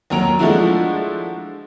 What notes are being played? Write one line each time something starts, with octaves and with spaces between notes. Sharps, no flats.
D#2 F#3 A#5 D7 F7
F3 G#3 A3 D4 E4 F#4